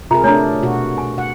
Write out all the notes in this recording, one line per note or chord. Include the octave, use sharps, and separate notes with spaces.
C3 F4 G#4 A#4 E5 A#5
A3 D4 C#5 G#5 A#5
B2 F#4
G#5
F#5